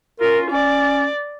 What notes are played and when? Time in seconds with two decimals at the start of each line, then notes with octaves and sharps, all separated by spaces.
0.20 C#4 F4 A#4
0.51 C#4 D5